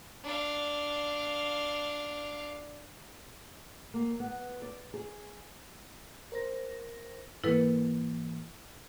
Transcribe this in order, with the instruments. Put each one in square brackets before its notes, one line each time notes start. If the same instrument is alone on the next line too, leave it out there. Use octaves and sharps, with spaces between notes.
[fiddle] D4 F5
[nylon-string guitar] A#3
B3
D5
G#4
[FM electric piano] A#4 C5 A#6
[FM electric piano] G#2 E3 A#3 [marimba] E4 A4 B4